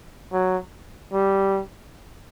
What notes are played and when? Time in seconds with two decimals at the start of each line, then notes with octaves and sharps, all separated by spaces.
0.33 F#3
1.13 G3